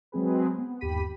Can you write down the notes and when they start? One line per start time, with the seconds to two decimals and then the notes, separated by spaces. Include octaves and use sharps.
0.12 F#3 G#3 C4 G#4 B4
0.58 B3
0.81 G1 D#2 G4 B5 B6 D#7